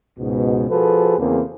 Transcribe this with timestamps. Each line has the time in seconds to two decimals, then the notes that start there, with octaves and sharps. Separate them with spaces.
0.19 C#2 G#2 B2
0.70 F3 F#4 G#4 A4 B4
1.19 E2 C#3 E3 A#3 C4